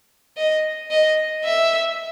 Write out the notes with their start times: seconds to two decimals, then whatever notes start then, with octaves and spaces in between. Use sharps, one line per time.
0.37 D#5
0.91 D#5
1.44 E5